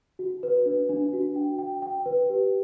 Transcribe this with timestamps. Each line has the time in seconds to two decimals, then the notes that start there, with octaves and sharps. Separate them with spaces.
0.19 F#4
0.43 B4
0.66 D4
0.89 D4
1.13 F#4
1.36 G5
1.59 G5
1.82 G5
2.06 B4
2.29 G4